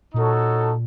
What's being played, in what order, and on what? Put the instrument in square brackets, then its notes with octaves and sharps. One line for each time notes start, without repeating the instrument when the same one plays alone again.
[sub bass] A#2 [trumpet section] D#4 F#4 A4 C#5